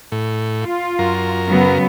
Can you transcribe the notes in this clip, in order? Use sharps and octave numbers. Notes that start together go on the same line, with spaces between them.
A2
F4
F#2 A#4
C#3 F#3 B3